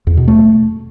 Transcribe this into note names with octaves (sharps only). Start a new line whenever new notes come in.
E2
B2
A3